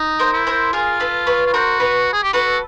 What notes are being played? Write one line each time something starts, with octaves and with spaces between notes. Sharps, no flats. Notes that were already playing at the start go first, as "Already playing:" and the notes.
Already playing: D#4
A#4 C5
E4
A#4 C5
F4 G#4 A#4
A4 B4
B4 C#5
F4
F#4 A#4 C5
B4 C#5
G#4
G4
F#4 A4 B4